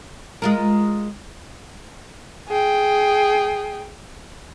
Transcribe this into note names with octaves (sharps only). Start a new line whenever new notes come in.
G#3 F4 A#4
G#4 G5